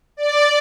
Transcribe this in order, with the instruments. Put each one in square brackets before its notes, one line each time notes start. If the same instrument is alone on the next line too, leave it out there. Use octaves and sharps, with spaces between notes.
[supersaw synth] D5